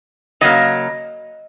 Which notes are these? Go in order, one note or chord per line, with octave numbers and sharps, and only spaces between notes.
C#3 F#3 A#3 D#5